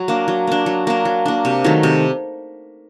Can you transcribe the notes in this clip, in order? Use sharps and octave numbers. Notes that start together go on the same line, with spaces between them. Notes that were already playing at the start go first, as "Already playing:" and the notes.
Already playing: F#3
A#3 D4
F#3
A#3 D4
F#3
A#3 D4
F#3
A#3 D4
C3
D#3 F#3 A3
C3